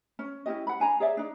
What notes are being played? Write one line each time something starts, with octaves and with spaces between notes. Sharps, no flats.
C#4
C#4 E4 G4 D#5
F#5 B5
D4 G#5 A#5
G#4 C#5 D5 E5
D4 D#4